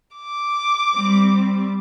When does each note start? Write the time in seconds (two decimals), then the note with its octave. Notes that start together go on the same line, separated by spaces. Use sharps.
0.16 D6
0.93 G3 C4